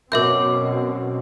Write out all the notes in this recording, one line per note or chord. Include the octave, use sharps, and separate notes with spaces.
F#2 B2 C4 A#4 E5 D6 G6